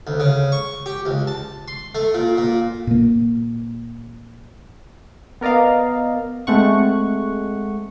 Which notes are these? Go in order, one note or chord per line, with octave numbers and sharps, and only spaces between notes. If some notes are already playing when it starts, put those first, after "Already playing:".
D2
C#3
C#6
G4
C#2
A5
C6
A3
A#2
A#2
A#2 A#3
B3 A#4 D5 D#5 F5
G#3 A3 C4 F#5 C#6